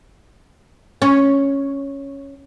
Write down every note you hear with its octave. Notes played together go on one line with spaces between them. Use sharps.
C#4